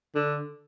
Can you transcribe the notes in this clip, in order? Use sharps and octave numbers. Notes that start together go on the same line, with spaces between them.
D3